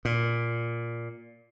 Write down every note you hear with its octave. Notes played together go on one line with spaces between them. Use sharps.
A#2